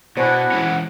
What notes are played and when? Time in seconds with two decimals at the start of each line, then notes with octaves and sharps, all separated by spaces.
0.17 B2 D4 E4 F#4 C5 F#5 G#5
0.52 E3 G#3 C#4